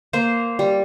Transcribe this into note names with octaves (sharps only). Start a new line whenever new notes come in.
A#3 C5
G3